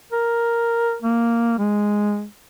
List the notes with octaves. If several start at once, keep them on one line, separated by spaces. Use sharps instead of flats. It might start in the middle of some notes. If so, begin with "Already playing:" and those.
A#4
A#3
G#3